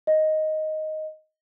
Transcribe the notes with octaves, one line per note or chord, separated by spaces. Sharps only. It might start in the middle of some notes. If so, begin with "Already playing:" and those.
D#5